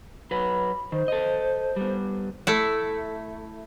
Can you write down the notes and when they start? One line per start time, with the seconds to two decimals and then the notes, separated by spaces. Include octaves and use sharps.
0.31 F#3 B4 B5
0.92 D#3 C5
1.08 A4 D#5
1.76 G3 B3
2.47 A3 E4